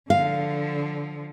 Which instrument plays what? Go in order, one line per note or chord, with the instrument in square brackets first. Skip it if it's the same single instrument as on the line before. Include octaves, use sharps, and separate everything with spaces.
[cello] D3 F3 [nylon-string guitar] F5